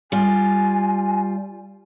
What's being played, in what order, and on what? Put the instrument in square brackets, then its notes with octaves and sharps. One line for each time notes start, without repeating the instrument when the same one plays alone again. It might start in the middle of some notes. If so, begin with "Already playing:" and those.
[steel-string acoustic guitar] G3 F4 [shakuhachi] G#5